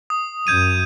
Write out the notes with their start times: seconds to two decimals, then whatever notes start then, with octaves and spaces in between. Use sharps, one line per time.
0.10 D#6
0.47 F#2 G6 G#6 D#7